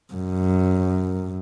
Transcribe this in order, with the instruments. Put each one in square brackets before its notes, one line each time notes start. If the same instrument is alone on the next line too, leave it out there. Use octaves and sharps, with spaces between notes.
[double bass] F#2